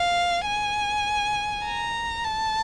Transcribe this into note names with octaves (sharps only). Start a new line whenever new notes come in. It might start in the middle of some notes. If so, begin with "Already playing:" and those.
Already playing: F5
G#5
A#5
A5